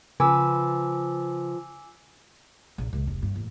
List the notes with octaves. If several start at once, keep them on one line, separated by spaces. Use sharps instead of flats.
C#3 F3 B4 G#5 D6 E6
A#1
C#2
F1
G2
A1